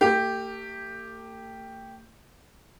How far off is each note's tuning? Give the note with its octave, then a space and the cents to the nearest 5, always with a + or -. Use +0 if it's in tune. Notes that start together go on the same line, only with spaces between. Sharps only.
A3 +45 G4 +0